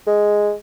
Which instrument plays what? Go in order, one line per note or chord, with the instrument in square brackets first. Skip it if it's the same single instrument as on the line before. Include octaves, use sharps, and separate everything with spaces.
[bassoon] G#3